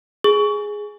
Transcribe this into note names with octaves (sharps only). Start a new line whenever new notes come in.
G#4